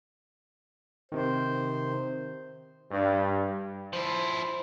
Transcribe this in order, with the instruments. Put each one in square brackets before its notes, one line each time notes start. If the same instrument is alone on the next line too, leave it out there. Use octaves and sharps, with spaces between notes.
[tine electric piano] C3 D#3 [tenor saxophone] C5
[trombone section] G2
[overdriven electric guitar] F3 E4 [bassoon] C5